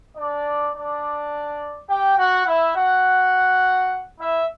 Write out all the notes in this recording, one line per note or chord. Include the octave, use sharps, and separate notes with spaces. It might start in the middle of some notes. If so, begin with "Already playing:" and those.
D4 D5
D4 D5
G4 G5
F#4 F#5
E4 E5
F#4 F#5
E4 E5